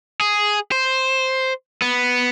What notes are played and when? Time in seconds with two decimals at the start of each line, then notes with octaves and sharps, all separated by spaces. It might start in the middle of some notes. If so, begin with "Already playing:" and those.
0.21 G#4
0.72 C5
1.82 B3